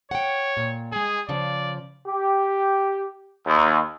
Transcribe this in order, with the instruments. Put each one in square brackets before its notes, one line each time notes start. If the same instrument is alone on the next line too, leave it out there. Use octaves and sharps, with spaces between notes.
[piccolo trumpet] C#5 [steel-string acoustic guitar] F#5 G5
[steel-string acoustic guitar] A#2
[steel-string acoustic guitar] G#3 G#5 [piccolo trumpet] G#4
[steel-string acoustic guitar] C#3 F3 [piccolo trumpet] D5
[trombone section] G4
D#2